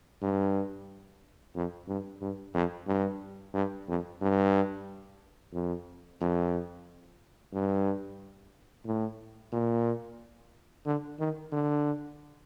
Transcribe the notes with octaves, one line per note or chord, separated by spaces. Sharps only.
G2
F2
G2
G2
F2
G2
G2
F2
G2
F2
F2
G2
A2
A#2
D3
D#3
D3